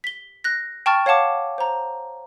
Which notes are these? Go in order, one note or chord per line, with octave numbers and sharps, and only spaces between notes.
B6 G7
F#6 A#6
G5 A5 C#6 F6 A6
C#5 F5 F#5 A5 D6
C5 A#5